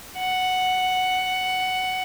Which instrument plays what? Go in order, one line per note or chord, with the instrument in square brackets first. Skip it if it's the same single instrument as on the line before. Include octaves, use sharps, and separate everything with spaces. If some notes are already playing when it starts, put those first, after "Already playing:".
[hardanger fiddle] F#5